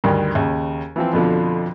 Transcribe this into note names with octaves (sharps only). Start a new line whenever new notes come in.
D2 G2 D#3 G3
D#2 C#3
E3 F3 C4
F2 B2 D3 F3